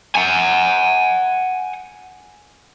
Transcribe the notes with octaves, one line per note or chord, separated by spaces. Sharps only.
F#5 G#5